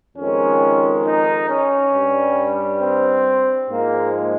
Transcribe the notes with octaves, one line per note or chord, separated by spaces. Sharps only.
F2 D#3 G#3 C#4
D#4
C#4
G2 G3
C4
G#2 F3 G#3 A#3